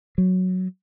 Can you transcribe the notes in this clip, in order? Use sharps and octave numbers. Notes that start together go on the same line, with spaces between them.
F#3